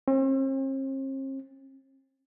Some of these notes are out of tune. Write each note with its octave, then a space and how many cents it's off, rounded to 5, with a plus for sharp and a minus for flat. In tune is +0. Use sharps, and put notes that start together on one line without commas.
C4 +45